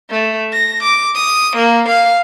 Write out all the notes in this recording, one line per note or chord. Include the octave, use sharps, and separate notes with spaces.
A3
A#6
D6
D#6
A#3
F5